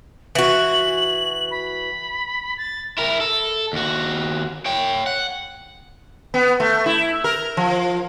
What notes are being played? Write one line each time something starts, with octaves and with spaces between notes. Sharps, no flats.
E3 F#4 F#7
B5
A6
E4 A#4
A4
D#2 F#4
C#5 G5
F#5
B3
A3
E4
A#4
F3